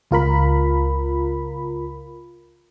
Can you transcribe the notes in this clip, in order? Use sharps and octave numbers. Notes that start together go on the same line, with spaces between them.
C#2 F4 A#4 B5